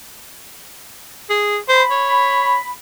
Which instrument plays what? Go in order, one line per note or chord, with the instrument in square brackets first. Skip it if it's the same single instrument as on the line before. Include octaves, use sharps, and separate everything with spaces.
[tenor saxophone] G#4
[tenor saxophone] C5 [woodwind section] B5
[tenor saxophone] C#5